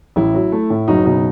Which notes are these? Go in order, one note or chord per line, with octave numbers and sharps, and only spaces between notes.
A1 E4
F#3
A3
A2
F#1 D#4 F#4
B2 D#4